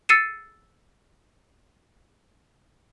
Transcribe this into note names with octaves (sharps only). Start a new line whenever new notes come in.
E6 A6 C7 C#7 D#7 E7